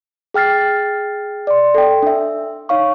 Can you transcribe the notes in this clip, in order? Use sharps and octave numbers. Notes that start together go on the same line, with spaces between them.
G#4 G5 F6 A6 C7
D5 C6
A4 G5
D4 E5
D#4 C#5 F5 C#6